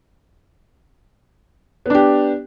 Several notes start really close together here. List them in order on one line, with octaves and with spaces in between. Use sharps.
B3 D4 G4